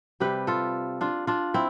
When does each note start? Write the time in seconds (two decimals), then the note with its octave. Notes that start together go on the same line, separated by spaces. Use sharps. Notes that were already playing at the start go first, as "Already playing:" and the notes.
0.20 C3 G3 G4 B4
0.47 F4 A4
1.01 D4 F4
1.27 D4 F4
1.54 C4 E4